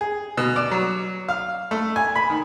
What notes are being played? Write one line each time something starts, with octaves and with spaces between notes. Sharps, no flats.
G#4
B2
D5
F#3
F5
A3
G#5
B5
D#3